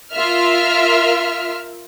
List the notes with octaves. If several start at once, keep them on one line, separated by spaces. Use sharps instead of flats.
F4 A#4 E5 F6